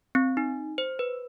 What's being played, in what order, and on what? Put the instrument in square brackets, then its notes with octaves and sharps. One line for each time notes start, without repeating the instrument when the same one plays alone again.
[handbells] C4
D#4
C5
B4